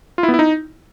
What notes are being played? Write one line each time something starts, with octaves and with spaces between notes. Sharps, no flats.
F4
E4
B3
E4
D#4